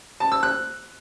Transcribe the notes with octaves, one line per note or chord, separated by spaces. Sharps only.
A5
E6
F#6